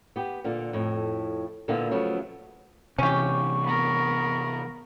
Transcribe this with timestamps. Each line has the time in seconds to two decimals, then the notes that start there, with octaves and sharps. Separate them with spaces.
0.16 B3 G4
0.44 A#2 D3 F4
0.73 F2 A2
1.68 A#2 D3 A#3 B3 E4 F4
1.91 C#3 F3 F#3 A3 B3
2.98 C3 E3 C#4 G4 C#6
3.63 B3 A#4